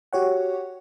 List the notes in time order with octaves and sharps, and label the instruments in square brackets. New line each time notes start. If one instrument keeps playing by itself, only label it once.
[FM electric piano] F#4 G4 C#5 F#5